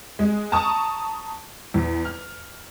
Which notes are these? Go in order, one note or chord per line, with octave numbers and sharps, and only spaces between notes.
G#3
A5 A#5 C#6 D#6
E2
F6